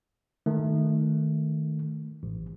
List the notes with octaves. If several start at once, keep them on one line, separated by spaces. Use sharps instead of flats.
D#3 A3
A1